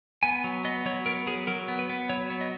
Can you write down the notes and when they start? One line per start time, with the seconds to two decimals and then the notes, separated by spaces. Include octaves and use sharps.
0.23 B3 G#5
0.44 F#3
0.65 B3 D#5
0.86 F#3 C#5
1.06 B3 A#4
1.27 F#3 G#4
1.47 F#3 A#4
1.68 B3
1.79 B4
1.89 B3
2.09 F#3 C#5
2.30 B3
2.41 D#5